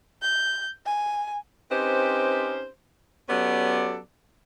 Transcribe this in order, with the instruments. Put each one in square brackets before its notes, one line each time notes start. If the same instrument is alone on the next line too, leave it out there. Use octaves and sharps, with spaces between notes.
[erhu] G6
G#5
[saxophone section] C4 C#4 D#4 G4 B4 C5
F#3 B3 C#4 G4 A4 D5